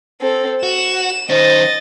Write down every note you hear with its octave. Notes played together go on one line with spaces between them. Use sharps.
C4 A4
F#4 E7
D#3 C#4 C5 D#5 A6